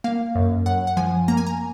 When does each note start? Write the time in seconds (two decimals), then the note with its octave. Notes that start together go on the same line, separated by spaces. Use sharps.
0.04 A#3 F5
0.35 F#2
0.66 F#2 F#5
0.87 F#5
0.97 F3 G#5
1.28 A#3 A#5
1.37 G#5
1.47 A#5